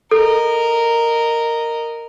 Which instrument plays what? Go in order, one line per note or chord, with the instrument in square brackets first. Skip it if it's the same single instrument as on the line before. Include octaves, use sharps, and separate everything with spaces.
[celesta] A4 [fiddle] A#4 D#5